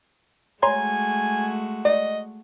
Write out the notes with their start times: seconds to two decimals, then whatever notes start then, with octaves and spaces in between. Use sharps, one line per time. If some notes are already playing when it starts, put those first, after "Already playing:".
0.63 G#3 A3 F#4 C#5 G#5 A#5 C6
1.85 D5 D#5